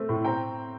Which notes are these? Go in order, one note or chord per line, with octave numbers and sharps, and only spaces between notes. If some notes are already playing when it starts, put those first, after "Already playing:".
Already playing: A3 C4
A2
C4 G5 A#5